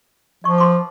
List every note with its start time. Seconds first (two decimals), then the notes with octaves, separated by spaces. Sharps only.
0.44 F3 D#5 C#6
0.58 B4 C6 D6